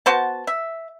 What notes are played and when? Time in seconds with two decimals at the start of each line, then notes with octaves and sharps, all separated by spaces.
0.06 B3 F#4 C5 A5
0.47 E5